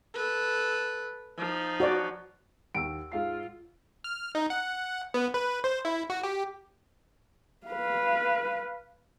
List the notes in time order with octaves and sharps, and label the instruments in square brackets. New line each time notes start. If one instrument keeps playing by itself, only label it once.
[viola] A4 B4
F3 D#4
[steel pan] F#4 C#5 D5
[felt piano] D#2 [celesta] F#5 E6 [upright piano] D7
[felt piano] G#2 F5 C7 [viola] F4
[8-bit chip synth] F6
D#4
F#5
B3
B4
C5
E4
F#4
G4
[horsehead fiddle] B4 F5